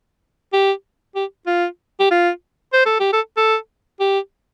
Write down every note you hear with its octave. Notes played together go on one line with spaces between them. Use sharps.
G4
G4
F4
G4
F4
C5
A4
G4
A4
A4
G4